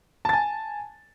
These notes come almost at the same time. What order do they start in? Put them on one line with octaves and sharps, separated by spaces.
A5 A6 G#5